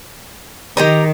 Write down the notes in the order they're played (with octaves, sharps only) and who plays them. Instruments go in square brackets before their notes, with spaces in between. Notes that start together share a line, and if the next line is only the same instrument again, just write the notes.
[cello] D#3 [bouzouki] G4 D#5 A#5